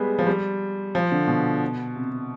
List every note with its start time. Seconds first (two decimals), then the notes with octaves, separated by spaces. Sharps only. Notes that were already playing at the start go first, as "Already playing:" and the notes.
Already playing: G3 G#3 B3
0.19 F3
0.27 G3
0.95 F3
1.12 D3
1.27 B2
1.96 C3
2.12 C3